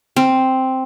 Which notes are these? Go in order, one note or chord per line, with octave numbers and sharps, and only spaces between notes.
C4